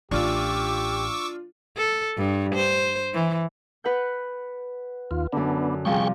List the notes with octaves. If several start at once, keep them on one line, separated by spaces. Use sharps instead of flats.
A1 D4 F4 G4 C#6 D6 E6
A4
G2
C5
E3
B4 F#5 G6
D#2 F4
F#2 D3 B3 D4
C3 F3 G3 G#4 G5 C#6